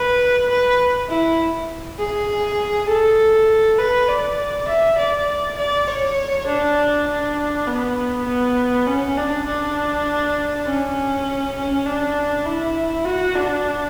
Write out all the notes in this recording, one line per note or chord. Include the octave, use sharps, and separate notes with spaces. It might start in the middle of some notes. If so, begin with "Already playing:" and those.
Already playing: B4
B4
E4
G#4
A4
B4
D5
E5
D5
D5
C#5
D4
D4
B3
B3
C#4
D4
D4
C#4
C#4
D4
E4
F#4
D4